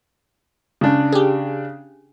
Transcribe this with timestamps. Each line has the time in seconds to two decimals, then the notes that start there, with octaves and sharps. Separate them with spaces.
0.81 C#3 D4
1.13 G4 G#4